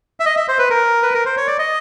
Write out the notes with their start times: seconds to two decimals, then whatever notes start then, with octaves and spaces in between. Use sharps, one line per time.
0.20 E5
0.26 D#5
0.37 E5
0.48 C5
0.59 B4
0.70 A#4
1.03 B4
1.14 A#4
1.25 C5
1.37 C#5
1.47 D5
1.59 D#5